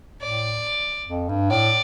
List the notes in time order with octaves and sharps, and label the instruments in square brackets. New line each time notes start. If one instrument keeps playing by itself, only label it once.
[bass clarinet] A2 [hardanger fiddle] D5
[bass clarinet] F2
G2
[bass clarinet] A2 [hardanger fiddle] D5